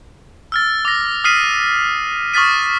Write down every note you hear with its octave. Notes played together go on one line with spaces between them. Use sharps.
E6 F6 A6
D6 A#6
D#6 F6 B6 C7 D#7
C#6 D#6 F6 A6 B6 D#7